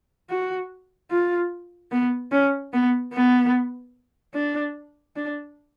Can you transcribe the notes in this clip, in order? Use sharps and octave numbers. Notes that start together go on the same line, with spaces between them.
F#4
F4
B3
C#4
B3
B3
D4
D4